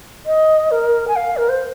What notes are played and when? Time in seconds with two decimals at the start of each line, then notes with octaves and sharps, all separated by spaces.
0.26 D#5
0.71 A#4
1.07 G#5
1.16 F5
1.37 A#4
1.49 C5